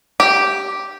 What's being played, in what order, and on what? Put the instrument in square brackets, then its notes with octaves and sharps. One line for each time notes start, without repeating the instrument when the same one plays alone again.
[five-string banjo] G4